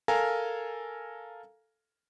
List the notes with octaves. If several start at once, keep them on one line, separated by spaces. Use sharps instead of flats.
A4 A#4 F5 G#5 A#5